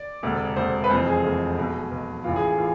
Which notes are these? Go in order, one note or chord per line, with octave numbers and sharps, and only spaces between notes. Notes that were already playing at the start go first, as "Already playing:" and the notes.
Already playing: D5
E1 D2 C3
E1 D2 C3 C5
B4
F1 F2 E3 C5
G#4
F1 F2 E3 G#4
B1 B2
B1 B2
A1 A2 E3 F4
G#4
G#4
A2 E3 F4